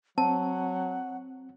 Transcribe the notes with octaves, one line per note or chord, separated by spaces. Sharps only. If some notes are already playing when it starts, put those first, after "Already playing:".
F#3 C4 F#5 A5